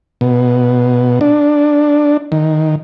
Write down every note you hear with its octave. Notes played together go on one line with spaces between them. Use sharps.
B2
D4
D#3